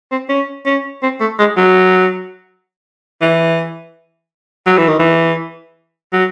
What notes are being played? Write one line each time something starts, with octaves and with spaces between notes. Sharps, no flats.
C4
C#4
C#4
C4
A3
G#3
F#3
E3
F#3
E3
D#3
E3
F#3